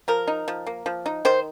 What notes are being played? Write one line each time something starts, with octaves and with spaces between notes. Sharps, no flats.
F3 A#4
D#4
F3
A#3
F3
D#4
D#3 C5